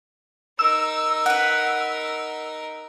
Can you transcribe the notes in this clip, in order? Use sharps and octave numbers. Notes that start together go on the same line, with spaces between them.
D#4 A#4 E6
B4 F#5